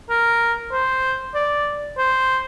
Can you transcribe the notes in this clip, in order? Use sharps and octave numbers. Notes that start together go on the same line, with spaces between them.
A#4
C5
D5
C5